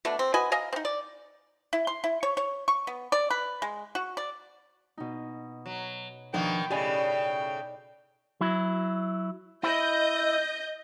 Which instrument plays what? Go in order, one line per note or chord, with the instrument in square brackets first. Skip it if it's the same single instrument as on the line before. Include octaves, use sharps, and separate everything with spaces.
[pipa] B2 A3 D4
C4
F#4 B4 D#5 G#5
D#5 F5 G#5 A#5
C4 D#4
D5
E4
C6
E4
C#5
C#5
C#6
B3
D5
B4
G#3
F#4
D5
[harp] B2 D#4
[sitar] F#3
[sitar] B2 D#3 A#3 [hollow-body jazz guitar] F3 D4 D#4 [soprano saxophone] G5
[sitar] A2 C#3 [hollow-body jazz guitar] G4 G#5 [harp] D5 D#5 B5
[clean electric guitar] F#3 E4
[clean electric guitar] E4 [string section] D#5 G6